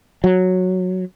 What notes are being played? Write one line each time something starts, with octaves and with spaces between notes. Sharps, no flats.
F#3